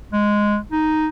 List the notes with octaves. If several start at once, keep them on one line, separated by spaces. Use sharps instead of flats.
G#3
D#4